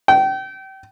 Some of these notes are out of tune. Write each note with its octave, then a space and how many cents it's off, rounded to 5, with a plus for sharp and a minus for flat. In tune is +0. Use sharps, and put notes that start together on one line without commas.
G5 -30